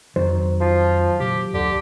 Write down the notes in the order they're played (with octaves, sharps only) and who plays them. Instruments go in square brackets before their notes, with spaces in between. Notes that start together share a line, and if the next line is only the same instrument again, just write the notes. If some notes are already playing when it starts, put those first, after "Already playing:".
[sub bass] F2 [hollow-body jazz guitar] D#3 F#3 C5
[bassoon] F3 [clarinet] F4
[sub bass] A#2 [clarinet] G4
[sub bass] D2 [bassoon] D3 [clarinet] G4